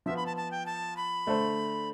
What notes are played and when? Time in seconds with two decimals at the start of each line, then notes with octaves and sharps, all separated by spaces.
0.06 F3 B3 F4 E5
0.17 B5
0.26 A5
0.37 A5
0.51 G5
0.66 A5
0.97 B5
1.27 D3 A3 D4 A4 C5